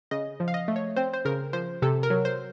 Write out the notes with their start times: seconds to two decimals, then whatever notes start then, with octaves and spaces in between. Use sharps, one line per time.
0.11 C#3 D#5
0.40 F3
0.48 F5
0.54 D#5
0.68 A3
0.76 C#5
0.96 C4 C5
1.13 C5
1.25 C#3 A#4
1.53 F3 C5
1.82 C3 A4
2.03 A#4
2.10 F#3
2.25 C5